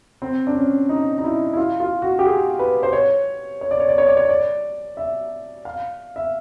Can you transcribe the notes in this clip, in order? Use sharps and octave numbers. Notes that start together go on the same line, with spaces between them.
C4
D4
C#4
D#4
D#4
E4
E4
F4
F4
F#4
G4
G#4
B4
C5
C#5
C#5
D5
C#5
D5
C#5
D5
C#5
D5
E5
F5
E5